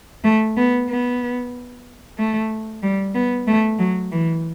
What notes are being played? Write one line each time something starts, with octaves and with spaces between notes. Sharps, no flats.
A3
B3
B3
A3
G3
B3
A3
F#3
E3